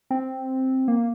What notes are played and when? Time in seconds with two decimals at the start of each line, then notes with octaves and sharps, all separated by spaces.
0.11 C4
0.88 A#3